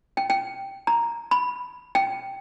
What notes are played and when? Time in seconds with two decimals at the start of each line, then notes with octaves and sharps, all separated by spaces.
0.17 G5
0.30 G5
0.87 A#5
1.31 B5
1.95 G5